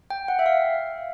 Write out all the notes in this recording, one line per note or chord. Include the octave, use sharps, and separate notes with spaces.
G5
F#5
E5
F5